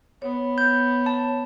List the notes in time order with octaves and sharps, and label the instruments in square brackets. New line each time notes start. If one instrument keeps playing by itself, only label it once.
[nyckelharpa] B3 [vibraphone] C#5
[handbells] G6
A5